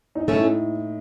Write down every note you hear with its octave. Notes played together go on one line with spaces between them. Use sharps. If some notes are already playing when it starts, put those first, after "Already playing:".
D#4
A3 C#4
A2